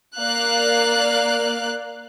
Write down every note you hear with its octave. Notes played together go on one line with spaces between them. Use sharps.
A#3 D5 F5 F#6